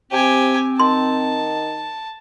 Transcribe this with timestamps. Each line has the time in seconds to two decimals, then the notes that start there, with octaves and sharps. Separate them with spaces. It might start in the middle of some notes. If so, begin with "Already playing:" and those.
0.11 C3 C4 G4 G#5
0.80 D#3 A5 C6